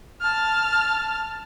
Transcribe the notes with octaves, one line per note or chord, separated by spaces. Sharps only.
A5 F6